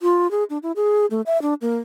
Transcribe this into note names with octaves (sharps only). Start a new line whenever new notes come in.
F4
G#4
D4
E4
G#4
A3
E5
D4
A#3